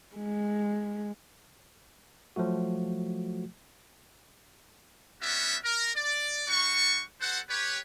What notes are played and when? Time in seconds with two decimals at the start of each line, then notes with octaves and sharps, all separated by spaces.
0.16 G#3
2.36 F3 F#3 A3 F#4
5.21 G3 B3 C#4 D4 F#4 E5
5.64 A#4
5.96 D5
6.48 G3 D4 F#4 C#6
7.21 F#4 A4 C5 F#5
7.49 G4 B4 C#5